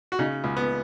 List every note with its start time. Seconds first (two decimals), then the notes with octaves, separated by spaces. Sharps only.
0.12 F#4
0.19 C#3 D#4
0.44 C#2
0.57 B3